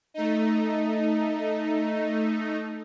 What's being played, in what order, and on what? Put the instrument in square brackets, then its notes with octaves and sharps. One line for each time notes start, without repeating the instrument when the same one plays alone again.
[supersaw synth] A3 D#4